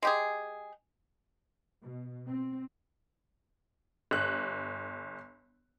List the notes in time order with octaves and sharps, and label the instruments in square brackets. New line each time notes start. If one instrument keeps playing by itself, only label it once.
[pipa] G#3 G4 G#4
[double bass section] B2
C4
[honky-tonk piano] G1 F#6